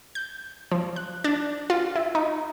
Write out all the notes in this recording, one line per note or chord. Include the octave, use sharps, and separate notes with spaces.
G6
F3
F#6
D4
F4
E4
D#4